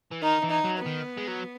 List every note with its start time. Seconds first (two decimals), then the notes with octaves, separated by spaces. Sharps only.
0.11 E3
0.22 D#3 D#4
0.43 E3
0.50 D#4
0.64 F#3
0.79 B3
0.86 D#3
1.18 G#3
1.28 F#3